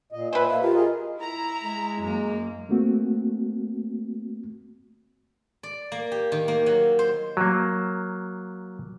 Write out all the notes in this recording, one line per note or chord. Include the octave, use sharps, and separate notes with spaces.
A#2 D#5
A#2 B4 C5 E5 G#5
A#3 E5
F4 G4 A#4
G#4 A#4 D#5
E4 A#5
G#3
F#2 A#3
A3 A#3 C4 F#4
D5
A#3
G4
D#3
A#3
F#3
C5
F#3 A#3